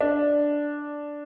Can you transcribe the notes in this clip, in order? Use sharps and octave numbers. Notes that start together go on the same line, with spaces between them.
D4